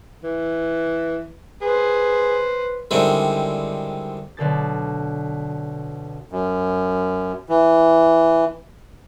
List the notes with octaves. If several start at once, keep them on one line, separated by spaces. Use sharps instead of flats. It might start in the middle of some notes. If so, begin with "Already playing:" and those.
E3
G#4 B4 C5
D3 D#3 G3 G#3 C4 E4
B1 D3 A4 A6
F#2
E3